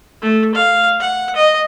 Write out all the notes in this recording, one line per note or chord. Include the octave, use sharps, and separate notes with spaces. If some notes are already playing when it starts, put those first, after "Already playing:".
A3
F5
F#5
D#5